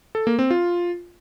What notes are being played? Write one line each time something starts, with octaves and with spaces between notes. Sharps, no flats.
A4
A#3
C4
F4